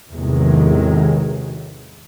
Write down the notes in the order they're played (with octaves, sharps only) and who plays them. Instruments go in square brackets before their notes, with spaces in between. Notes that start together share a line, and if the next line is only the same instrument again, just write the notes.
[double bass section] E2 A2 C3 D#3 F#3 G#3